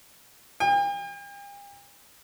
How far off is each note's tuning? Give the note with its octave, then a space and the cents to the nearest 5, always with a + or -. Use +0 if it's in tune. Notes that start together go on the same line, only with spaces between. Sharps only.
G5 +45